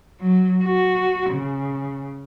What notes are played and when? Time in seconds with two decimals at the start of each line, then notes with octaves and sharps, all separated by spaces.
0.19 F#3
0.62 F#4
1.29 C#3